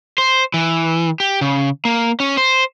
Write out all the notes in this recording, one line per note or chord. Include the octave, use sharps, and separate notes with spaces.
C5
E3
G4
C#3
A#3
C#4
C5